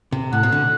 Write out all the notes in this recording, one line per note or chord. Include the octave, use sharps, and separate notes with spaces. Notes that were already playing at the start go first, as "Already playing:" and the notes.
C3
A2 F#5
B2
D3